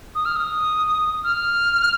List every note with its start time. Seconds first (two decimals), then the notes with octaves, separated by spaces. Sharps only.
0.15 D#6
0.25 F6
0.36 D#6
1.24 F6